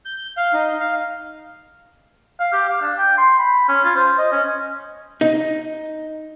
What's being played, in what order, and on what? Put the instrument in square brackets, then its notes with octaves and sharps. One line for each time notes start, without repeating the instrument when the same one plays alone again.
[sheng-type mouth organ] G6
F5
D#4
F5
[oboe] F5
G4
F5
D4
G5
C6
B5
C#4
F4
C5
D#5
C#4
[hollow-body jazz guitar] D#4